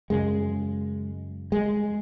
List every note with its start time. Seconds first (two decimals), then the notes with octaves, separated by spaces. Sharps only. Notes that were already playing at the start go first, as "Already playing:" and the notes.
0.10 F#2 C#3 G#3
1.52 G#3